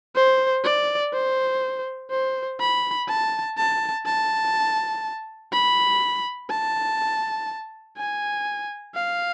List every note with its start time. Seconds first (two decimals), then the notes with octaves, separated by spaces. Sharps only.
0.15 C5
0.64 D5
1.13 C5
2.11 C5
2.60 B5
3.08 A5
3.58 A5
4.06 A5
5.53 B5
6.51 A5
7.97 G#5
8.95 F5